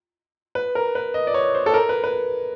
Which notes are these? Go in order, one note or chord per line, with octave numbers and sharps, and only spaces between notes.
B4
A#4
B4
D#5
D5
C#5
C5
A4
A#4
B4
B4